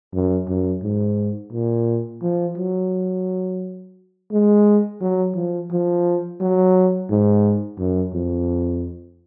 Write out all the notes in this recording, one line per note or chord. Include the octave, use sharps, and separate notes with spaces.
F#2
F#2
G#2
A#2
F3
F#3
G#3
F#3
F3
F3
F#3
G#2
F#2
F2